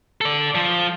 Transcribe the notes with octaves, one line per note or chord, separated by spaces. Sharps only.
A4 D5
F3